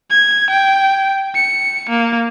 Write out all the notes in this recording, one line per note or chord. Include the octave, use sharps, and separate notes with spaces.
G#6
G5
C#7
A#3